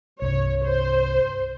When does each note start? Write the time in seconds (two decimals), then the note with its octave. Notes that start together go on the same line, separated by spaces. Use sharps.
0.22 C2 G2 C#5
0.65 C5